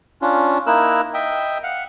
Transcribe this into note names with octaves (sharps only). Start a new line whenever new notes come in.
C#4 D4 F4
A#3 D#4 E4 A#4 E6 F#6
D#5 E5 G5
F5 F#5